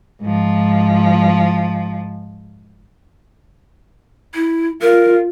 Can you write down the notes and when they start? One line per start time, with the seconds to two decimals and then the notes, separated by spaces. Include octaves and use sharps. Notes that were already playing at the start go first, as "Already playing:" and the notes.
0.21 G#2 F3
4.34 E4
4.81 F4 A#4